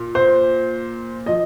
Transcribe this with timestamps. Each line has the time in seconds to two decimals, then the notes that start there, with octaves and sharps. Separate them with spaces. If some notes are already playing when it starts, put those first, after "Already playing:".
Already playing: A#2
0.15 C5
1.26 F3 D#5